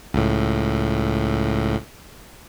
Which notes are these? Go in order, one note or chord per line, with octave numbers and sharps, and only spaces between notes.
C#2 A2